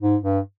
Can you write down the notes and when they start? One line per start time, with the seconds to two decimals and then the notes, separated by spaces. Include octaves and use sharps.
0.01 G#2
0.23 G2